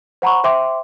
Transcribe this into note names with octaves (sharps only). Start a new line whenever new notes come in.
C5 F#5 A#5 B5 C#6
C5 E5 G5 C6 D6